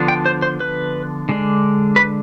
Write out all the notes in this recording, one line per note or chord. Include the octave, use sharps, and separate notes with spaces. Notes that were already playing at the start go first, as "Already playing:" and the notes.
Already playing: D3 F3 B3 D4
G5
C5
C5
B4
D3 G#3 D4
B4